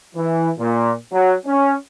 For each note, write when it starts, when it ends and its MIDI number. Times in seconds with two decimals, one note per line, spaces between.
0.16 0.50 52
0.59 0.92 46
1.13 1.35 54
1.46 1.74 61